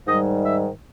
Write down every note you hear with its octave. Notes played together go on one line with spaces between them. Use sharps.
G#2 D#3 G3 D#5
E5